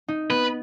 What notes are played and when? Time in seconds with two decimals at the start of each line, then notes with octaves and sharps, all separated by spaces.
0.08 D#4
0.30 B3 B4